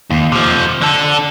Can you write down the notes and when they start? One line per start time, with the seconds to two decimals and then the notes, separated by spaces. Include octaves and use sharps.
0.11 D#2
0.32 C3 F3
0.81 D3 A4